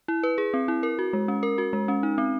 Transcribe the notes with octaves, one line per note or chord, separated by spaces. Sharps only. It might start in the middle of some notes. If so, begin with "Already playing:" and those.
E4
B4
G#4
C4
E4
A#4
F#4
G#3
C#4
A#4
F#4
G#3
C#4
D#4
C4